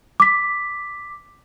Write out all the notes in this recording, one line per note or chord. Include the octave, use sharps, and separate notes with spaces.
D6 B6